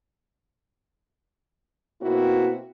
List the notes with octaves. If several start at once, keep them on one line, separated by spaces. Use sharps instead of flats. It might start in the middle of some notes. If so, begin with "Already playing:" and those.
B2 A#3 C4 E4 F#4